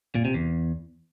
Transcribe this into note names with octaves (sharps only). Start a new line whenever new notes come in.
A#2
C3
E2